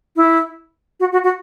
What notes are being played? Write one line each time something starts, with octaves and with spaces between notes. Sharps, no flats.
E4
F#4
F#4
F#4